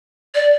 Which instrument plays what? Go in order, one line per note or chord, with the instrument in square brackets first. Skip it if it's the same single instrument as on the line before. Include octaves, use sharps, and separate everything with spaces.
[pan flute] D5